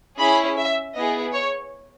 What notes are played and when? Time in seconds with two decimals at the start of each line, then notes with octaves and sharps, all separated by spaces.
0.19 C#4 E4 G#4 B5
0.57 E5
0.95 B3 E4 G#4 D#5
1.33 C#5